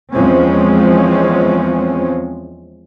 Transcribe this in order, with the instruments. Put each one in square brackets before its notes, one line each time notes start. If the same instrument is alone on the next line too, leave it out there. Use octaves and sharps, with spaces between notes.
[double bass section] E2 F3 G#3 C4 C#4